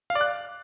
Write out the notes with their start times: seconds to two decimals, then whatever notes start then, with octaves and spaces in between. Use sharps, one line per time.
0.10 F5
0.15 D5
0.21 F#6